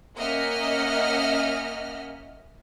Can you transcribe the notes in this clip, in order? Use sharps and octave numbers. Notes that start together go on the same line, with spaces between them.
A#3 C#4 D#5 E5 F#5 F6